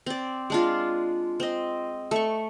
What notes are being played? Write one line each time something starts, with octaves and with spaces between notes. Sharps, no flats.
C4 D5
G#3 D4 F4
C4 D#5
A3 C#6